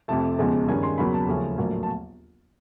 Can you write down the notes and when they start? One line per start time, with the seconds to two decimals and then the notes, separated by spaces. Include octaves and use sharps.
0.08 F2 C3 F3 A3 A5
0.39 E1 E2 C#3 F3 G#3
0.68 G2 D#3 G#3 C#4 G#5
0.83 C6
0.98 E2 C#3 F#3 A#3 B5
1.14 A5
1.28 D#2 C#3 F3 A3 C#4
1.58 A#1 A2 F#3 A#3
1.83 A5